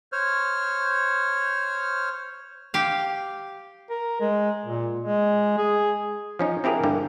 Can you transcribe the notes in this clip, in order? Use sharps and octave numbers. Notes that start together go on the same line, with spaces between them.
C5 C#5 F6
G4 F5
A#4
G#3
A#2
G#3
G#4
F3 C#4 D#4
C4 E4 G4 G#4 A#4
G2 D3 G3 A#3